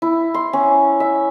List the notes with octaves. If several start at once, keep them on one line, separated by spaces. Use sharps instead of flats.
E4
C6
C#4
E5